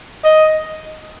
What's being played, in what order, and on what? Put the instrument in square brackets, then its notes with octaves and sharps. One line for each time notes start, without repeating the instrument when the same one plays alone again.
[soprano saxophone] D#5